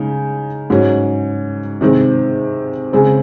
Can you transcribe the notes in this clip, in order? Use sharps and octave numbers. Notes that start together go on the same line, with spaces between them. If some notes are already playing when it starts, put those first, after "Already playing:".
Already playing: C#3 G#3 D#4
G#2 F#3 C#4
C3 D#3 G#3 C4
C#3 G#3 C4